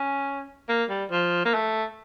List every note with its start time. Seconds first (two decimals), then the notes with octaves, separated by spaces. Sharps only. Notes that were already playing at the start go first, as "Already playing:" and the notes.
Already playing: C#4
0.69 A#3
0.90 G3
1.11 F3
1.45 A#3
1.54 A3